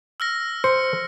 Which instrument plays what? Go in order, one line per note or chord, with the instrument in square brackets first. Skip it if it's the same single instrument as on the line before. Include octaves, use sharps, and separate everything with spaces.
[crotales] E6 F6 A#6
[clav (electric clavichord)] C5 [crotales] C#7